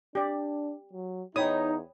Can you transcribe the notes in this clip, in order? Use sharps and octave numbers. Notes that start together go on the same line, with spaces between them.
D4 G4 D5
F#3
E2 D#4 C#5 G5 B5 D#6